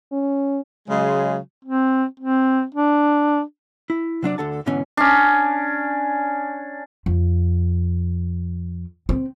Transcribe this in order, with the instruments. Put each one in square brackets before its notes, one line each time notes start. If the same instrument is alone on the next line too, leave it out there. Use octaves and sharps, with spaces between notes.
[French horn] C#4
[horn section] C#3 F#3 G#3
[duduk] C4
C4
D4
[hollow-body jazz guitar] E4
C3 F#3 D4 D5
D2 D3 A4 F#5 A5
G#2 B2 D3 E3 C#4
[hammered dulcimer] C#4 D4
[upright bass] F2
C4